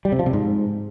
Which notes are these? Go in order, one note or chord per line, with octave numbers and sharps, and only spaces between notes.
G3
C3
F3
C3
G#2